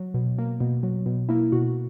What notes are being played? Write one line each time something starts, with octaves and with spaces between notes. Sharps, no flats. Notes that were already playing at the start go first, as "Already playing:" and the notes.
Already playing: F#3
B2
A#3
B2
F#3
B2
A#3 E4
B2 F#4